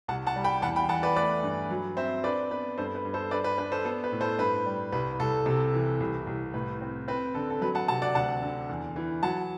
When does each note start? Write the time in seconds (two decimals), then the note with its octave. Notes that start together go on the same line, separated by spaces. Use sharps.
0.08 C2 F#5 A5
0.27 F#5 A5
0.36 G3
0.44 G5 B5
0.62 E2 F#5 A5
0.76 G5 B5
0.89 E2 F#5 A5
1.03 B4 D5
1.16 A3 B4 D5
1.43 G2
1.70 F#3
1.97 C4 C5 E5
2.24 D4 B4 D5
2.51 B3 B4
2.78 G2 A4 C5
2.95 B4
3.05 G2
3.14 A4 C5
3.31 D4 B4 D5
3.44 B4
3.58 D4 B4
3.72 A4 C5
3.85 B3 A4
4.04 B4
4.12 A2
4.21 A4 C5
4.39 G2 B4
4.66 G3
4.92 C2 B4
5.19 C2 A4
5.46 C3 A4
5.74 E3
6.00 C2
6.27 C2
6.54 A2 B4
6.81 C4
7.08 C4 B4
7.35 D3 A4
7.50 A4
7.61 F#3 B4
7.75 F#5 A5
7.88 C3 F#5 A5
8.02 D5 F#5
8.15 D2 F#5 A5
8.42 D3
8.69 E2
8.96 E3
9.23 F#3 F#5 A5